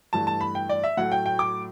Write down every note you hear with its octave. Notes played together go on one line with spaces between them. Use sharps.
G2 E3 A3 A5
A5
B5
G5
D5
E5
A2 F#3 A3 F#5
G5
G5
D6